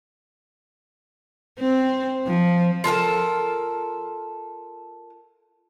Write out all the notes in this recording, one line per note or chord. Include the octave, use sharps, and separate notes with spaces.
C4
F3
F4 A4 A#4 A5